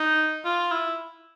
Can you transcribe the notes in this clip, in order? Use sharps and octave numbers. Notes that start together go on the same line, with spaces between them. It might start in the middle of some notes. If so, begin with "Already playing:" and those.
Already playing: D#4
F4
E4